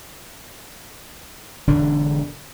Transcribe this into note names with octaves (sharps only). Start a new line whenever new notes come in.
E1 D3 D4